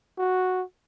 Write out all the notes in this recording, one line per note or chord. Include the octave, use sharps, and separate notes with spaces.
F#4